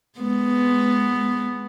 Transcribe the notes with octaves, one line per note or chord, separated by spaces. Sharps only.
G#3 B3